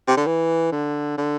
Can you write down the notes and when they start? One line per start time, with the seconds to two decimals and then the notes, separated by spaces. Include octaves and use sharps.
0.07 C3
0.16 D3
0.26 E3
0.72 D3
1.18 D3